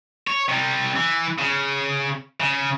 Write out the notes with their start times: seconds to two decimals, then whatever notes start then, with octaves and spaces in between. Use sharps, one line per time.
0.27 C#5
0.49 C3 G3
0.96 E3
1.38 C#3
2.40 C#3